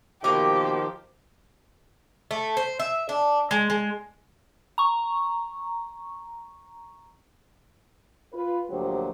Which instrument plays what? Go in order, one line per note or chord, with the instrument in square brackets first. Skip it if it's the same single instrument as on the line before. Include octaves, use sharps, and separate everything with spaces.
[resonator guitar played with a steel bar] B2 A#3 [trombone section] D#3 F3 C5 [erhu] G4 [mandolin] A#4 D6
[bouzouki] A3
C5
E5
D4
G#3
G#3
[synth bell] A#5 C#6
[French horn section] F4 B4
D2 A#2 F3 F#3 G4 C5